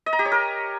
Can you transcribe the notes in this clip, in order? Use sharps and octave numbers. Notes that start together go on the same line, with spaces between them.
D#5
A#5
G4
C#5
A#4